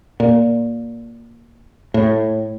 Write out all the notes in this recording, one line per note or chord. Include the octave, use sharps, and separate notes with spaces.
A#2
A2